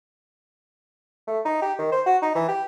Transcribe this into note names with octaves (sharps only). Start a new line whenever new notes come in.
A3
D#4
G4
D#3
C5
F#4
D#4
E3
G4